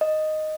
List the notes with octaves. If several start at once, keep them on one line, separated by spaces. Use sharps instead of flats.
D#5